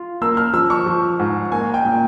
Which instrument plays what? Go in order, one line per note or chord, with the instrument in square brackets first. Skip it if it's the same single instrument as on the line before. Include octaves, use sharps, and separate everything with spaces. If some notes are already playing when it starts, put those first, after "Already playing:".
Already playing: [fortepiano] F4
[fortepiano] A#3 [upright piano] E6
[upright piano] F6
[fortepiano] F3 [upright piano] E6
[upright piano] C#6
[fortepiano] F3
G#2
[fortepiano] A#3 [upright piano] G#5
[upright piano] G5
[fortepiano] A#2